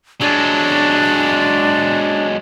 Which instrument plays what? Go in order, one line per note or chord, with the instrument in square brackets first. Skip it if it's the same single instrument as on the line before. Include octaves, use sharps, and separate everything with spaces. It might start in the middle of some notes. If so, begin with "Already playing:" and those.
[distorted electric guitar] F#3 G#3 [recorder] D4